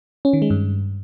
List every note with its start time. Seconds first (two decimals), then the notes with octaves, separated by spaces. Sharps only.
0.25 C#4
0.33 D#3
0.42 G#3
0.50 G2